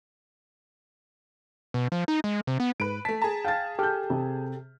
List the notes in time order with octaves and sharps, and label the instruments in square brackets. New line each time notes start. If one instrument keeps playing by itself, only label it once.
[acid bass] B2
F3
D#4
G#3
C3
B3
[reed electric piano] G#2 [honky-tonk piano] B4 D7
[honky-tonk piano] A3 B6 [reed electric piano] A5
[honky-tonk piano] G#4 A5 [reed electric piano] A#5
[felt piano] F5 A6 [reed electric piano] G5
[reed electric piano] G4 A4 G5 [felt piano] F6 G6
[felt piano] C3